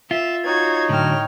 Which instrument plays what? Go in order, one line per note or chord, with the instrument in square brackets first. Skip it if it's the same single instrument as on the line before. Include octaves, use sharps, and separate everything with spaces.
[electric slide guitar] F4 [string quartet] E5
[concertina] D#4 C#5 [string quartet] F#4 G#6
[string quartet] A2 G5 F6 [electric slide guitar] D3 F#3